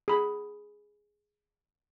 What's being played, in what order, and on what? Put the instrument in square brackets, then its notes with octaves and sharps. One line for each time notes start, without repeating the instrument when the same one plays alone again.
[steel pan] G#4 B5